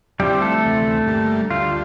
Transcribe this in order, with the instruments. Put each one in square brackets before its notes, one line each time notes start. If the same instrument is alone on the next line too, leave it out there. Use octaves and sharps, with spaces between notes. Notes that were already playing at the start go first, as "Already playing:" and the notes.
[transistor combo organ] D3 F3 C4 E4 [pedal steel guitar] G3 G4
[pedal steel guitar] A3 A4
[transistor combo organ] D2 C3 E3
G2 D3 G3 A#3
[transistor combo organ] D2 D3 G3 [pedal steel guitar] F4